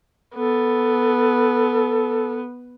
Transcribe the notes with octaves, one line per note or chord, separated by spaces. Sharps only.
B3 A4